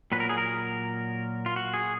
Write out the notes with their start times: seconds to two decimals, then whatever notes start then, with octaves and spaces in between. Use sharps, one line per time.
0.12 A#2 F#3 B4
0.20 A#4
0.29 G#4
0.38 A#4
1.46 F4
1.56 F#4
1.74 G#4